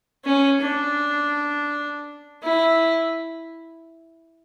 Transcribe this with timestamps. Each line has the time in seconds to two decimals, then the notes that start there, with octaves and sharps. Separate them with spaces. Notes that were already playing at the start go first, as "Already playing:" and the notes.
0.25 C#4
0.61 D4
2.43 E4